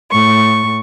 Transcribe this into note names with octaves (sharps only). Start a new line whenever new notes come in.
A2 C#6